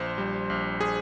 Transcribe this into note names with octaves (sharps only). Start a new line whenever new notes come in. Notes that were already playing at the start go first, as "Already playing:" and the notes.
Already playing: A#1 C5
G3
A#1
G#4